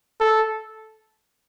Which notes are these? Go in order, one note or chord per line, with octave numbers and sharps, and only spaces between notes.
A4